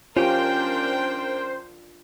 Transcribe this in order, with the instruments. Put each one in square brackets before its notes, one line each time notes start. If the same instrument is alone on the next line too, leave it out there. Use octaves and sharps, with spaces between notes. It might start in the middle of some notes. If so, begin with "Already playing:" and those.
[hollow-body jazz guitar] C#4 G4 [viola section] D4 A#4 G5 [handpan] F4 [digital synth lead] C5